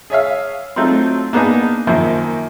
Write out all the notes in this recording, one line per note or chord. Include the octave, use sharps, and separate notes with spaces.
G#4 C#5 E5 F5
F#3 A3 C4 D#4 F4
A#3 B3 D4 D#4 G#4
F#2 D#3 F3 A#3